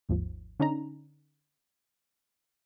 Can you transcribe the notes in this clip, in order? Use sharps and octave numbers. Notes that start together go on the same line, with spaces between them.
G#1 D#2 G#2 F3
D3 C#4 D#4 A#5